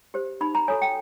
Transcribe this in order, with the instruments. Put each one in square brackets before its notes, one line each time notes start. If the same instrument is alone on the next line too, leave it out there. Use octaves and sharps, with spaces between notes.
[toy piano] G4 C5
D#4 B5
A#5
F#4 A4 C#5 G#5
G5